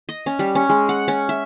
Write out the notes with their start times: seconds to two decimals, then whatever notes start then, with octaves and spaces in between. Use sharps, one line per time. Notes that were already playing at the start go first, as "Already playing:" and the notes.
0.09 D#5
0.26 C#4
0.39 G3
0.55 C#4
0.70 G#3
0.89 F#5
1.08 C#4
1.29 E5